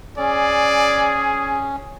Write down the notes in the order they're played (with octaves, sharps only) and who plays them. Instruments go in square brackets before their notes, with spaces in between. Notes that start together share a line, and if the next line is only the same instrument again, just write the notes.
[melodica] C#4 [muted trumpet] G#4 [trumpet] D5